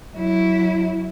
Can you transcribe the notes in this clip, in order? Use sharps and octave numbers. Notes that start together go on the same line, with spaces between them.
F#3 E4